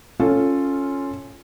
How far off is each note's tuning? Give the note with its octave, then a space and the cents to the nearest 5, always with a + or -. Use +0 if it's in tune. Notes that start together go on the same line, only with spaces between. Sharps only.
C#4 +0 F4 +0 A4 +0